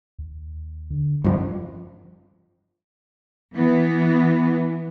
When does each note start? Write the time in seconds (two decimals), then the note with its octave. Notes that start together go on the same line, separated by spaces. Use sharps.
0.19 D#2
0.90 D3
1.24 G2 C#3 F3
3.53 E3 B3